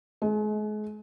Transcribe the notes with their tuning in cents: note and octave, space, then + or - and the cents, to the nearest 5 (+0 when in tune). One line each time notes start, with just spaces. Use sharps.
G#3 +35